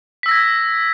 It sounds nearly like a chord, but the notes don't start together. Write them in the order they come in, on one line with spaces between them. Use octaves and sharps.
B6 E6 A#6 G#6